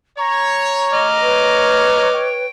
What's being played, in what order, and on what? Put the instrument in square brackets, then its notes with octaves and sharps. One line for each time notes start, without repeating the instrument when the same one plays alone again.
[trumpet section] C#5 [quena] A#5
[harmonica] D#5 D6 F6
[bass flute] B4 [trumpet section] C#5
[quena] G5